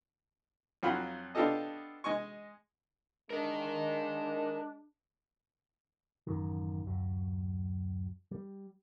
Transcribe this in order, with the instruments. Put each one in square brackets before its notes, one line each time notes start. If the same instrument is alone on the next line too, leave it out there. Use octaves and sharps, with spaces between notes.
[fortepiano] F2 F#3 F4 F#5 B5
B3 D4 F4 G4 A4 D#5
G#3 D#5 G#5 C#6
[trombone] G#3 [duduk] D4 [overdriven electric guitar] A#4 D#5
[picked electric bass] A1 F#2 D#3
D1 F#2 F#3
G3